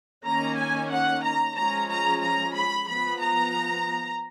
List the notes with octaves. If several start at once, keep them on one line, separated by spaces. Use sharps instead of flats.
D#3 A#3 C#4 A#5
G#5
F#5
A#5
F3 G#3 C#4 A#5
A#5
A#5
B5
F3 B3 B5
A#5